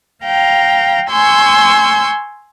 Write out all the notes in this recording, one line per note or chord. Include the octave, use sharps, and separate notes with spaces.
F5 G5 A#5
G#5 C6 C#6 E6 G6